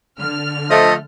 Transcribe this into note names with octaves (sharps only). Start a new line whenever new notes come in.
D3 F6
F3 A3 A4 D#5